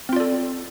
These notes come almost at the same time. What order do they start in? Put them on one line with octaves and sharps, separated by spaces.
C4 F4 D5 A4